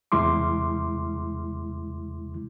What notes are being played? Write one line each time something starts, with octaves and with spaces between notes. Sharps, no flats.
E2 C3 G#3 E4 C6 D6